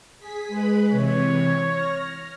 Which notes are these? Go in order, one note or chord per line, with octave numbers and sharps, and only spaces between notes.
G#4 B6
G#3 B4 B5
C3 E3 C#5
F6 A#6